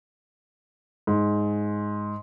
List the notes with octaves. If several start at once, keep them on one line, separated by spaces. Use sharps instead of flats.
G#2